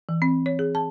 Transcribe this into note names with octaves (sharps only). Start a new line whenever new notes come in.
E3
C4
C#5
G#4
A5